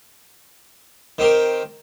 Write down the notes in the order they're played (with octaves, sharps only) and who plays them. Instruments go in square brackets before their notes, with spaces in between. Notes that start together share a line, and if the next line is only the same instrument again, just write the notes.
[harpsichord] D#3 C4 G4 A#4